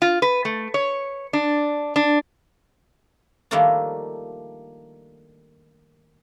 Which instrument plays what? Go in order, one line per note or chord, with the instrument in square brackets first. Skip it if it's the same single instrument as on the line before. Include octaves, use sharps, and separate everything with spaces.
[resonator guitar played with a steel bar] F4
B4
A3
C#5
D4
D4
[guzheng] D#3 F3 G3 A3 A#3 D4